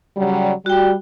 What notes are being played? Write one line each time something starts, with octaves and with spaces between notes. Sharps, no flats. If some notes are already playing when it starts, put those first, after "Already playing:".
C#3 F#3 G3
G3 F#4 G5